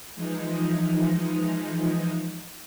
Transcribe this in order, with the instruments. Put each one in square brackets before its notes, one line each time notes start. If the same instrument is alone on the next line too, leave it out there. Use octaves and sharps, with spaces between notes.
[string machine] E3 F3 G#3 D#4